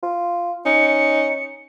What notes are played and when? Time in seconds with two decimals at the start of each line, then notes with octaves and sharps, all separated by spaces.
0.03 F4
0.66 C#4 D#4 C#7